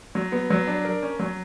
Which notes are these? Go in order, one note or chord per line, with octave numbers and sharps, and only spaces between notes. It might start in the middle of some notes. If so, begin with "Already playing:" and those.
F#3
B3
F#3
D4
A#4
C#4
F#3